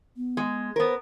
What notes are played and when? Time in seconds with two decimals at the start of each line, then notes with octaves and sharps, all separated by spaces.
0.17 B3
0.37 G#3
0.76 B3 A#4 C5